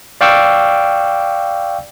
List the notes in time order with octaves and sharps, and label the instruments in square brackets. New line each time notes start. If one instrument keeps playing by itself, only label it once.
[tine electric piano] D5 F5 G5 C#6 D6 E6